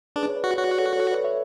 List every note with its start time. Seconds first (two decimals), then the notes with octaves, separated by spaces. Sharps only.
0.16 D4 G#4 B4
0.29 C#5
0.36 B4 D5
0.44 F#4
0.57 F#4 C#5
0.68 D5
0.79 A4 C#5
0.97 A4 C#5
1.11 B4 D5
1.24 C#5 E5